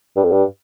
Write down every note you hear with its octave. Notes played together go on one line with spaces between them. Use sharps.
G2
F2
G2